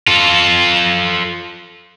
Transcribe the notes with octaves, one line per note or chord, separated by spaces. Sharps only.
F4 A4